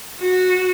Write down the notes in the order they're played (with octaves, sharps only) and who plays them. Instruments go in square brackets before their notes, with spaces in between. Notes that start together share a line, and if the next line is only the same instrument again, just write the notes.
[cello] F#4